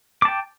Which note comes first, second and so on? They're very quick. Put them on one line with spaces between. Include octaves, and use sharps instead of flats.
D6 A5 G5